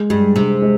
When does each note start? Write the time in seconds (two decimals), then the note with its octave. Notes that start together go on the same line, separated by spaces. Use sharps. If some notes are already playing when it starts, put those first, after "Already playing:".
Already playing: G#3
0.10 G2 G#3
0.36 C3 G#3
0.62 G#3